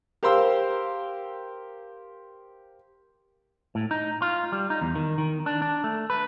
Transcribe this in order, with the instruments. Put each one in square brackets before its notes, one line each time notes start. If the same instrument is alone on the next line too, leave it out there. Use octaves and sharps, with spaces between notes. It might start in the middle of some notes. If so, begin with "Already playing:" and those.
[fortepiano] G4 A#4 C5 F5 C6 E6
[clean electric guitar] A2
D#4
F4
G3
D#4
E2
D#3
D#3
D4
D4
A3
B4